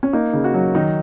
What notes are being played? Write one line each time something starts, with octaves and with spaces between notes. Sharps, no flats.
C#4
A#3 D#4
C#3
F#4
F#3
D#3 D#4